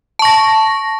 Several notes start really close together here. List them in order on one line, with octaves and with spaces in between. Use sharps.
A5 C#6 A#6